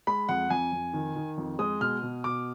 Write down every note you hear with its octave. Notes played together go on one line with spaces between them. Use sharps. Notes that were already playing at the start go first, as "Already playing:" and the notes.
G#3 B5
F2 F#5
F2 G#5
F2
D#3
D#3
F2
G#3 D#6
B2 F6
B2
B2 D6